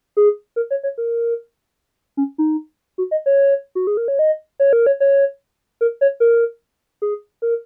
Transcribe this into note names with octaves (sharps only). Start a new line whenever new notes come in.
G#4
A#4
C#5
C#5
A#4
C#4
D#4
F#4
D#5
C#5
F#4
G#4
A#4
C#5
D#5
C#5
A#4
C#5
C#5
A#4
C#5
A#4
G#4
A#4